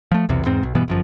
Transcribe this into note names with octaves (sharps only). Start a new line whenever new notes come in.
F3 A3
B1 E2 C3
E2 G#2 C4
B1
G2 B2 E3 B3
G1 F#2 F3